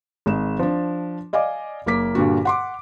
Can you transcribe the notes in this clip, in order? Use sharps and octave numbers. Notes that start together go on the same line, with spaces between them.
G#1 G#3 E7
F3 D4
D5 D#5 F5 G#5 D6
F#1 A#3 D6 B6
G2 A#2 D3 F#4
F#5 C6 D6